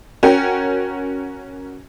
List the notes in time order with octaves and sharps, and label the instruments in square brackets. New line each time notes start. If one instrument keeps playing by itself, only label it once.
[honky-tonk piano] C#4 F#4 A#4 G5